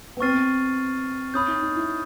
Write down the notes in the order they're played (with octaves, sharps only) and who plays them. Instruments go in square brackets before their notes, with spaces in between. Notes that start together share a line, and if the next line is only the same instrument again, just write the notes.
[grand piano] B3
[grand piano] C4 [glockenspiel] C#6 F6 A6 C7 D#7
[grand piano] C#4 [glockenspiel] B5 D#6 G6
[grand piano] D#4
D#4
E4